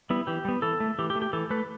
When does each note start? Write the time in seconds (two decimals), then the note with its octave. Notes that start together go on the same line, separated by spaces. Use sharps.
0.10 G3 B3 E4
0.27 E3 G4
0.45 G3 B3
0.62 E3 A4
0.80 A3
0.99 E3 G4
1.10 G4
1.16 A3
1.22 G4
1.33 E3 A4
1.50 A3 B4